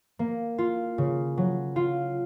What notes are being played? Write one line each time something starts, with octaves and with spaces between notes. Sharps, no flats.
A#3
F4
C#3
F#3
F4